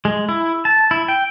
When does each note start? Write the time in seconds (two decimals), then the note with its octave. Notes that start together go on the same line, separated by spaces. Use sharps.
0.05 G#3
0.29 E4
0.65 A5
0.91 E4
1.08 G5